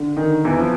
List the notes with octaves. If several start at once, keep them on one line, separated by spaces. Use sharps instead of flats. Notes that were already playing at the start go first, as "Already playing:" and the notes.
Already playing: D3
D#3
E2 E3
F3